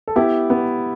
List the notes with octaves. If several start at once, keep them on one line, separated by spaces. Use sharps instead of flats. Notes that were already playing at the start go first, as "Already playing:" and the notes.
A4
B3 E4 G4
B3